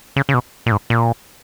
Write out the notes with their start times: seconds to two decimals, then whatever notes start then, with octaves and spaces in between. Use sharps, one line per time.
0.16 C#3
0.29 C#3
0.34 B2
0.66 A#2
0.72 G#2
0.90 A#2